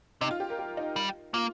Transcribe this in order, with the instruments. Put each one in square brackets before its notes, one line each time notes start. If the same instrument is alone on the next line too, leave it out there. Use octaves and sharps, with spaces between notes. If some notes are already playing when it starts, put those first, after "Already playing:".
[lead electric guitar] C3 [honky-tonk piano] D#4
[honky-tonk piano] F4
G4
A#4
G4
D#4
[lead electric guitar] G3
[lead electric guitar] A#3 [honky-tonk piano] F4